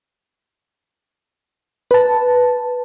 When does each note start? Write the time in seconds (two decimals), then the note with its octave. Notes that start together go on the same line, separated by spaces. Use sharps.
1.91 B4 A5